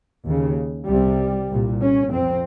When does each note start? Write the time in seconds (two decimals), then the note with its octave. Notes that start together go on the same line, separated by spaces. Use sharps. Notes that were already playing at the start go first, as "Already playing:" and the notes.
0.25 D#2 C#3
0.88 C2 C3 G3
1.49 C2 A#2
1.81 C#4
2.12 F2 C4